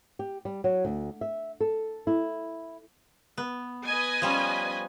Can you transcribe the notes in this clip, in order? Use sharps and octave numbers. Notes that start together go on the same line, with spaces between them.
G4
G3
F#3
D2
E5
A4
E4
B3
B4 D#5 G#5
F3 G3 C#4